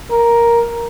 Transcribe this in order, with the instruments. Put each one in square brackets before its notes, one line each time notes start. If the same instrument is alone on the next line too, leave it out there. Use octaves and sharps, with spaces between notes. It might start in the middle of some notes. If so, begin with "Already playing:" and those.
[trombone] A#4